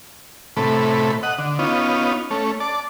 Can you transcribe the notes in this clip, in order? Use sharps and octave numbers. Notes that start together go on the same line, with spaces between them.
A2 C3 A3 B5
D#5 F#5
D3
B3 C#4 D#4 F4
A3 C#4
D5 A5